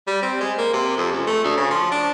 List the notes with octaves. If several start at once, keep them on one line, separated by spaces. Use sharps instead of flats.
G3
C4
G#3
A#3
C3
F2
C#2
A3
D2
C#3
F3
D4